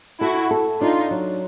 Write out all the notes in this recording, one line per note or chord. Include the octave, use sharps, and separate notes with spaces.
E4 F#4 A4
A4
D4 D#4 F4
F#3